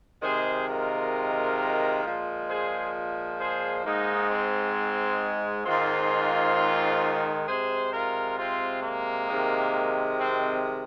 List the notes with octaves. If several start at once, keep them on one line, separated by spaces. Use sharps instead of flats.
C3 D#3 G#3 G#4 C5
F4 A#4
A#2 F3 G#3
G#4 C5
G#4 C5
G#2 G#3 A#3 D#4
C4
G#2 D#3 G#3 C4 F4
C3 G#3 G#4 C5
F4 A#4
C4 F4
A#3
C3 D#3 G#3
C4